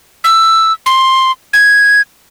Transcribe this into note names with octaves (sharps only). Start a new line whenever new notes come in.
E6
C6
G#6